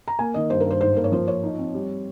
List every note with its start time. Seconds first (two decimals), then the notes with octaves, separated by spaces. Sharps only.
0.08 A#5
0.19 A#3 G#5
0.34 D#3 D#5
0.50 G2 C5
0.60 A#4
0.66 G2 C5
0.81 G#2 C5
0.96 A#3 A#4
1.04 C#5
1.12 F3 C5
1.27 F4 C#5
1.43 D#4
1.58 C4
1.74 G3